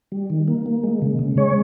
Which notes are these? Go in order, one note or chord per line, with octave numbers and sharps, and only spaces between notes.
G3
D#3
A#3
A#3
G#3
C#3
C#3
G#3 C#5